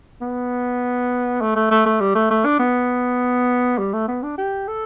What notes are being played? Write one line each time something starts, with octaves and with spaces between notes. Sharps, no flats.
B3
A3
A3
A3
A3
G3
A3
A3
D4
B3
G3
A3
B3
D4
G4
A4